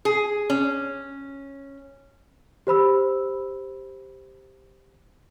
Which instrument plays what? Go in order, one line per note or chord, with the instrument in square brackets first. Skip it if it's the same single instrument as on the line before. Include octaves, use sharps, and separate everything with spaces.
[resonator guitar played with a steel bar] G#4
C#4
[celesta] G4 C5 B5 E6